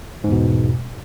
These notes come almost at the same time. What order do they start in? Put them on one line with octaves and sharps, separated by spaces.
G#2 E2 B2